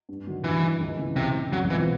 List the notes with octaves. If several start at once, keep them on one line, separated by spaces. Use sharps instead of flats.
G2
D#3 F#3
G2 E3
D#3 F#3
C#2
C#3 E3
C#2 C3
C#3 E3
C2 F#3
B2 E3 G#3 C4 F4